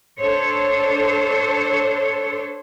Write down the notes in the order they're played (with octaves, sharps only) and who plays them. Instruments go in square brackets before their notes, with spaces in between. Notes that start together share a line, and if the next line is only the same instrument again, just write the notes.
[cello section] D4 A4 C5 C#5